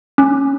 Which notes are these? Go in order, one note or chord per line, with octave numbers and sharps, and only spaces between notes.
C#4